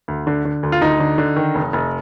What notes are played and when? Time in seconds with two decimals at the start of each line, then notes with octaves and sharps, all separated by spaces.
0.08 D2
0.27 D3
0.45 D3
0.63 D2
0.72 F4
0.82 D2 D#4
1.00 D3
1.18 D3
1.36 D#3
1.55 F1
1.73 F1